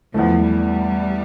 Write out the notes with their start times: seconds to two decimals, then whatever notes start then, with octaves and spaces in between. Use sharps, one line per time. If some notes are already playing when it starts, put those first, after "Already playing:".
0.14 E2 E3 F3 A3
0.46 G3